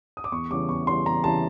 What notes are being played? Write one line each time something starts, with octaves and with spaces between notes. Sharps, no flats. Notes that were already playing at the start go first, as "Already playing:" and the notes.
D#6
D6
E2 C#6
C#3 E3 G3 D6
E2 C#6
C#3 E3 G3 C6
E2 A#5
C#3 E3 G3 A5